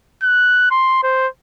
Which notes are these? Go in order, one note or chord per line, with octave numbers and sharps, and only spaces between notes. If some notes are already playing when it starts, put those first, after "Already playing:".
F#6
C6
C5